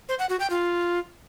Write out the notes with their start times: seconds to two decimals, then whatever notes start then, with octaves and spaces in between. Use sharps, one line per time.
0.09 C5
0.19 F#5
0.29 F#4
0.40 G5
0.50 F4